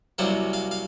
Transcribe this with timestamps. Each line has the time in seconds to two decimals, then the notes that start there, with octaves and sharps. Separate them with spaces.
0.18 C2 C3 F#3 A#3 C5
0.53 F5
0.71 F5